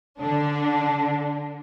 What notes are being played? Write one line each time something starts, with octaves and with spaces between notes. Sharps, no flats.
D3 D4